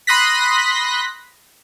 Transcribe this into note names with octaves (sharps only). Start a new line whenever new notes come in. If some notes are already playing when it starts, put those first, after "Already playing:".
B5 C6 D#6 F#6 A#6 B6